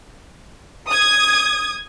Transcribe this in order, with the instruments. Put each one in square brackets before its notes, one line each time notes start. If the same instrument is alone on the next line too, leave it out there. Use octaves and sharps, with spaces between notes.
[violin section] D#6 G#6